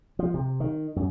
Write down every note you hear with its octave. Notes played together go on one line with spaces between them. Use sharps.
F3
C3
D#3
F#2